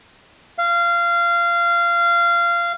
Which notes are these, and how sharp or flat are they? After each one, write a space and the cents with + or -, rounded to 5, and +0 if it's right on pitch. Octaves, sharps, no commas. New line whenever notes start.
F5 -20